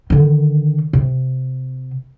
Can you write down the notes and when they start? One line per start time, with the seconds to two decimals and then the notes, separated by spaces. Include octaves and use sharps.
0.10 D3 D#3
0.93 C3